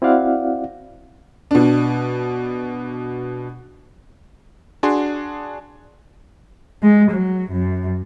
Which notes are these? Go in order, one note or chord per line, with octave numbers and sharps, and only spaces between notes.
C4 E4 F#4 D5 F5 F#5
B2 D4
D4 F#4 G#4 C6
G#3
F#3
F#2